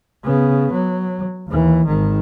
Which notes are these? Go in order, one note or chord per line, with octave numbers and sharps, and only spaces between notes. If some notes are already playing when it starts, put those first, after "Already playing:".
C#3 B3
F#3
D#2 E3
G#1 D#3